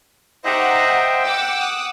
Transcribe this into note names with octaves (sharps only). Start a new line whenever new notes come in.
D#4 G4 C5 D#5 E5 F#5 A#5
G5
F#5 D6 E6
D#6 F#6